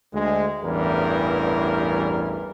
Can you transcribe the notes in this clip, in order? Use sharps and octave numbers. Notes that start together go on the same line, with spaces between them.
D2 G#3
A1 E2 G2 E3 G3 A#4